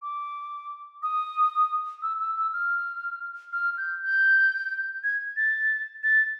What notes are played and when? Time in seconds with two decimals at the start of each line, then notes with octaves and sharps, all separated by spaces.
0.02 D6
1.03 D#6
2.02 E6
2.19 E6
2.36 E6
2.53 F6
3.53 F6
3.78 G6
4.03 G6
5.04 G#6
5.37 A6
6.03 A6